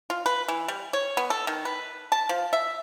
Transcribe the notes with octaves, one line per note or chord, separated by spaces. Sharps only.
F4
B4
E3
G3
C#5
B3
A4
D#3
B4
A5
F3
E5